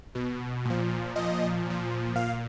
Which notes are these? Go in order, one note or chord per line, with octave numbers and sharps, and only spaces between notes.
B2
A#2 F3
A#2 F3 D#5
A#2 F3
A#2 F5